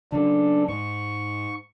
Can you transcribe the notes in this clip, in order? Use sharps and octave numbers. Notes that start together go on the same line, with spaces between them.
C#3 F#3 D4 A4
G#2 C#6